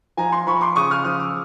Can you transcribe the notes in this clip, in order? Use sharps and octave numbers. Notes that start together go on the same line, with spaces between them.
F3 G#5 A#5
A#5 C6
F3 B5 C#6
C6 D6
C#3 C#6 D#6
D#6 F6
F3 D#6 F6
D6 E6